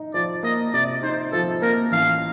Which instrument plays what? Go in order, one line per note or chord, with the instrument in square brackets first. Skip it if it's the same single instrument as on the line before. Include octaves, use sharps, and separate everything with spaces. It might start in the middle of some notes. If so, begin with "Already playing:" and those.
Already playing: [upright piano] D#4
[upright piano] F3 [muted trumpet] D5
[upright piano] A#3 [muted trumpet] D#5
[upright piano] C3 [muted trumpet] D5
[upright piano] D#4 [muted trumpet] C5
[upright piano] F3 [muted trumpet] A4
[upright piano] A#3 [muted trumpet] A#4
[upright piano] A1 [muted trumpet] F5